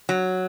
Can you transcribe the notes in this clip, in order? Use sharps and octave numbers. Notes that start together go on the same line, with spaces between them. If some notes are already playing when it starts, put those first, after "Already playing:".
F#3